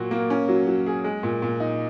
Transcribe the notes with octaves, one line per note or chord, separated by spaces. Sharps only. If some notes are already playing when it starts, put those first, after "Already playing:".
Already playing: A#2 F#3 F#4
A#3
C#4
F#3
F#3
G#4
G#3
A#2
A#2
D#4